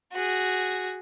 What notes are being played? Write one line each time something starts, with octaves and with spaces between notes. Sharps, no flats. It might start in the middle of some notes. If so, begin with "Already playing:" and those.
F#4 G#4